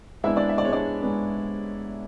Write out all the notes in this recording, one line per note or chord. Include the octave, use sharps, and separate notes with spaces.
G#2 G#3 B3 D4 E4 E5
D4 D5
E5
D5
G#2 G#3 B3 D4 C#5
D4 D5
G#2 G#3 B3 D4